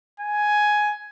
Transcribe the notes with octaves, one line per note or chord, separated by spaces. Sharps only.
G#5